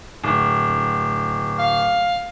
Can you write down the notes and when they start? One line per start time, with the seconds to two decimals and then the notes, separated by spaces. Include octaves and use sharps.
0.24 D1
1.59 F5